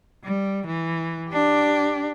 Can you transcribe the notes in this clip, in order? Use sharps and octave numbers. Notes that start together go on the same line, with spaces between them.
G3
E3
D4 G4